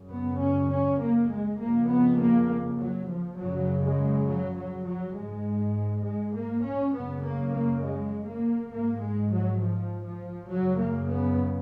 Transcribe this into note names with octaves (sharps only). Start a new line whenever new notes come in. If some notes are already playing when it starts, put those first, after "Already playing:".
Already playing: F#2 C#3
B3
C#4
C#4
A#3
G#3
F2 C#3 A#3
B3
A#3
F#3
F3
F#2 C#3 F#3
G#3
F#3
F#3
F#3
G#2 G#3
G#3
A#3
C#4
F#2 C#3 B3
A#3
A#3
G#3
A#3
G#2 A#3
G#3
F#3
F3
F3
F#2 C#3 F#3
A#3
B3